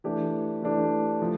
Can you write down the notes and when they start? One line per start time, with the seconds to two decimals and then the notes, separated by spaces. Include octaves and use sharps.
0.04 E3 A3 D4 G4
0.62 E3 A3 D4 G4
1.20 F3 A3